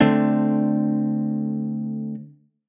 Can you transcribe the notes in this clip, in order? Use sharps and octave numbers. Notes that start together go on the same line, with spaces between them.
D3 A3 C4 D4